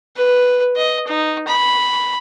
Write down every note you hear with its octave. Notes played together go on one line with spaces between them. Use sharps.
B4
D#5
D#4
B5